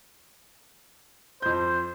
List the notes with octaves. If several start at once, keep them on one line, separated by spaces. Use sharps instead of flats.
F2 C5 G6